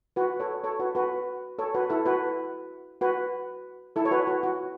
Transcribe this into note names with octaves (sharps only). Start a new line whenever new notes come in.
F#4 B4
A4 C#5
A4 C#5
F#4 B4
F#4 B4
A4 C#5
F#4 B4
E4 A4
F#4 B4
F#4 B4
E4 A4
C#5
F#4 B4
F#4
F#4